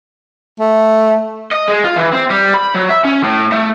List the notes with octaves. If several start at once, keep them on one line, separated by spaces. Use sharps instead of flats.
A3
D#5
G#3
F4
E3
C4
G3
B5
F#3
E5
C#4
A2
A3